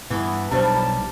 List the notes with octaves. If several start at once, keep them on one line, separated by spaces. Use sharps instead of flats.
G2 E3 B3
B1 G2 G3 D4 G4 C5 A5